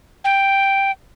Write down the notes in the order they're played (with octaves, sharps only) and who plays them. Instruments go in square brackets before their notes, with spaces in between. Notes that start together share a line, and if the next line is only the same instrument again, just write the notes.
[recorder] G5